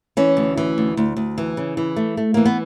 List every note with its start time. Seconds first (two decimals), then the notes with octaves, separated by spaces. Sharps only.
0.17 E3 C#4
0.37 D2
0.57 E3
0.78 D2
0.97 D2
1.17 D2
1.38 E3
1.57 C#3
1.77 E3
1.96 A3
2.17 A3
2.34 E3 A#3
2.45 B3